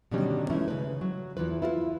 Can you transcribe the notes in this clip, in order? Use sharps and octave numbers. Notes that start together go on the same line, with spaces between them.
B2 D3 D#3 F#3 G3 C#4
E3 G#3 A3 C#4 E4 F4
C#3 B4
F#3
E2 E3 F4 B4
E4 F4 A#4 B4